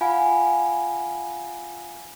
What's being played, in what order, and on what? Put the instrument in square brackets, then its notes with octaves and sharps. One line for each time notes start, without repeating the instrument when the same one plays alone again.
[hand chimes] F4 F5 F#5 G#5 B5